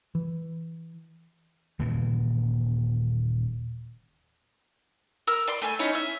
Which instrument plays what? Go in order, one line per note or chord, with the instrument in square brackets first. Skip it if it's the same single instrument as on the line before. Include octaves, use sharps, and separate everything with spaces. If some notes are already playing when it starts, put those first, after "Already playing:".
[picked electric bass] E3
[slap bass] D#1 A#2 C#3 E3
[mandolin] A#4 E6
D5 C6
A3 G#5 E6
C#4 D#4 E4 C#5
E5